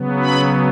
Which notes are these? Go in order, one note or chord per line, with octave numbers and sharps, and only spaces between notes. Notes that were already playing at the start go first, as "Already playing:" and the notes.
Already playing: C#3 F#3 B3
B5